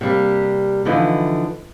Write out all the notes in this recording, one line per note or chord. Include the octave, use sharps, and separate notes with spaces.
C3 G3 A#3
D3 E3 F3 D#4 E4 B4